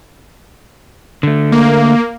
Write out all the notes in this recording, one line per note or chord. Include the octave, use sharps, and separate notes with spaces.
D3 A3
A#3